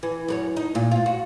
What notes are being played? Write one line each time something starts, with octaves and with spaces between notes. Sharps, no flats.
E3
F#2 B4 C#5
D#4
A#2
G#2 F4
F#4